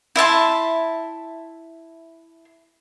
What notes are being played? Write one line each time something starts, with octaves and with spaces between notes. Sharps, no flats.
E4 E5 A5 C6